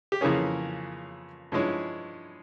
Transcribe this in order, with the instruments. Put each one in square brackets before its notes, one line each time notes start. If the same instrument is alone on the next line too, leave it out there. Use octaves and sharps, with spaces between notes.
[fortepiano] G4
F2 C#3 E3 A#3 C#4 G#4
G2 F3 G#3 C#4 E4